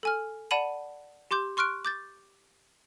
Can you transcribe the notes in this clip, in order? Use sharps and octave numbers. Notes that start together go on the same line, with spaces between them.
A4 G#5 F6
D5 F#5 A5 B5 D#7 F#7
G4 C6 D6 G6
C6 C#6 F6 F#6 D7
D6 G6 A6